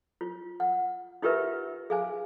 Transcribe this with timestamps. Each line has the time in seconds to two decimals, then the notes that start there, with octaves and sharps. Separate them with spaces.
0.21 F4
0.60 F#5
1.22 D#4 F4 G4 A#4 B4 E5
1.90 G#4 F5 G#5